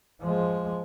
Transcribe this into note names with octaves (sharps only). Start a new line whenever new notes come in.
F3 G#3